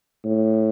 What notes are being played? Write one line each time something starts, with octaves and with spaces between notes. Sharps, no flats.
A2